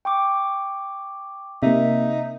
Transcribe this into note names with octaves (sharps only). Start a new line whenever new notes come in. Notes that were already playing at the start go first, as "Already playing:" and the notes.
G5 C#6 D6
C3 A#3 D#4 E5